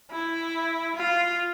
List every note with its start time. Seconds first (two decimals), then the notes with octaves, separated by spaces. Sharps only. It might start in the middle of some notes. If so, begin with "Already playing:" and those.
0.11 E4
0.96 F4